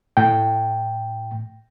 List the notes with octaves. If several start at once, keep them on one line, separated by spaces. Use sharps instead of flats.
A2 G5